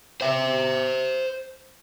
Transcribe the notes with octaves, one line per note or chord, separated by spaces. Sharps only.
C5 E5